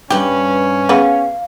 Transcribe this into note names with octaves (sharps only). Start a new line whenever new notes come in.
G2 C#4 G4 B4
C#3 B3 F5